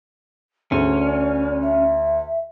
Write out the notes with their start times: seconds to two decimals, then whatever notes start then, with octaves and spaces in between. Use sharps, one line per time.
0.72 D2 C#4 G#4
1.00 D5
1.62 E5